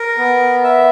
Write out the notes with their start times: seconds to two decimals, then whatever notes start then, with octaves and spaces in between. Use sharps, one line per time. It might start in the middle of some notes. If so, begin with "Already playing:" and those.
Already playing: A#4
0.18 B3
0.64 E5